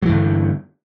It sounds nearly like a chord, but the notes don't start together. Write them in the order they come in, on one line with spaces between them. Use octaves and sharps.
F#3 E3 G2 D3